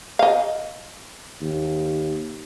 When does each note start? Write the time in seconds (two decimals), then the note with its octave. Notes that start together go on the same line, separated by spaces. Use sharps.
0.19 D#5 F5
1.41 D#2